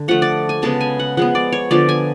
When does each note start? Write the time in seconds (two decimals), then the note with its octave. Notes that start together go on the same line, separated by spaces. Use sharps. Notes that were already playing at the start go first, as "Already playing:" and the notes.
Already playing: D3
0.08 F3 A3 F#5
0.22 D5
0.49 G#5
0.62 C#3 G#3 B3 A5
0.81 G#5
1.00 F#5
1.17 F3 G#3 B3 F#5
1.35 D5
1.52 C#5
1.71 D3 F3 B3 D5
1.89 G#5